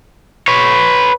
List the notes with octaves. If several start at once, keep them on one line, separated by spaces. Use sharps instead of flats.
B4 C#5